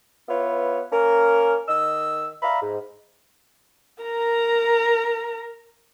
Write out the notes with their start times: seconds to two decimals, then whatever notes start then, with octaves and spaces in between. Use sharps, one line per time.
0.29 B3 E4 F4 B4 C#5
0.92 A#3 C#4 A#4
1.68 D#3 D#5 E6
2.42 D5 E5 F5 A#5 B5
2.61 G#2
4.03 A#4 A#5